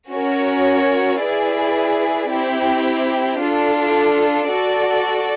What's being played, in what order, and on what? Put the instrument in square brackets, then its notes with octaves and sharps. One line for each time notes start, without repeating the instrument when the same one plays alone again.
[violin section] C#4 F#4 A#4 C#5
E4 G#4 B4 D5
C4 E4 G4
D4 F4 A4
F#4 A4 D5